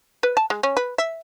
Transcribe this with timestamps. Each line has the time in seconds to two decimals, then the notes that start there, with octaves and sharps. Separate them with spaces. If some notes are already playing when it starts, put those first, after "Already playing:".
0.23 B4
0.37 A5
0.50 G#3
0.63 C#4
0.77 B4
0.98 E5